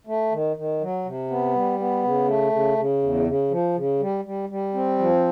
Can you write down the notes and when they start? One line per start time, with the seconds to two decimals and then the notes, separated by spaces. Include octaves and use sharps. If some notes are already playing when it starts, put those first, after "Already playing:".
0.07 A3
0.32 D#3
0.56 D#3
0.81 F#3
1.05 C3
1.30 B3
1.55 G3
1.79 B3
2.04 C#3
2.28 A3
2.52 C#3
2.78 C#3
3.03 E2
3.27 C#3
3.51 F3
3.76 C#3
4.00 G3
4.25 G3
4.49 G3
4.74 C4
4.98 F3